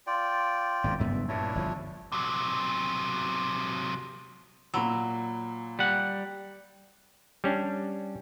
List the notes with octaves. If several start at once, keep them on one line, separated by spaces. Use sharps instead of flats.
F4 D5 G5
G#1 F2
F#1 G2 B3 E5
G2 A#2 D4 E4 C#5
G1 E2 F3
C3 F#3
A#2 F#3 B5 E6
G3 F#5
G3 C#4 D4